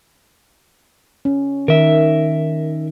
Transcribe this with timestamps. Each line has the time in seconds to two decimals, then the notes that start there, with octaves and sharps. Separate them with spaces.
1.25 C#4
1.68 D#3 A#4 E5